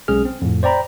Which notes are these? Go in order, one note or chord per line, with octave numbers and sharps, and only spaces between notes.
B1 G#3 C#4 G#4 F6
C4
F2 A2
C5 D5 G5 A#5 B5